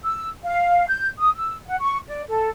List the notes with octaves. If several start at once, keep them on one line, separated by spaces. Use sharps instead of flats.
E6
F5
G6
D#6
E6
F#5
C#6
D5
A4